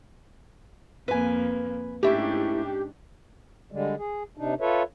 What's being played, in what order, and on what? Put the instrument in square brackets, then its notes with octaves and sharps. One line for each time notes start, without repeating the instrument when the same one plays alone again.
[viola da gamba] F2 A#3 [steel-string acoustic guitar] B4 G#5
[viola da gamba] G#2 C#4 D4 [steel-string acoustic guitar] A3 E4 [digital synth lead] G4
[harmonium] D3 G3 G#3
G#4
C3 D4 D#4
F4 A4 B4 C#5 E5